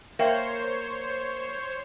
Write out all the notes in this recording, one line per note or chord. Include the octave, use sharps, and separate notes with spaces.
A#3 A#4 C5 C#5 E5 G5